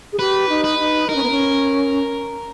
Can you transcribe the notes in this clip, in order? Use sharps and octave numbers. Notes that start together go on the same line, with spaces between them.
G#4
G4 B4
D#4
B4
D#4
D#4 A#4
C#4
B3
C#4